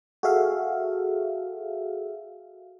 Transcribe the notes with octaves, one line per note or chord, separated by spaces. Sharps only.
F#4 G#4 A4 E5 F5